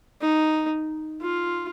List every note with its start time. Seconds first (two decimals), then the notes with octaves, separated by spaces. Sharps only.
0.21 D#4
1.21 F4